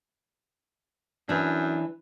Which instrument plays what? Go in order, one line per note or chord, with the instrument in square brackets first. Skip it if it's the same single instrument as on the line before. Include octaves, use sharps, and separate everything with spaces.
[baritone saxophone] F#2 [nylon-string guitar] E3 D4